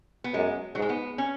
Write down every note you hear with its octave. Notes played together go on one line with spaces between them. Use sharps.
B3
F#2 G#3
G#2 F#3
G#3
B3
C#4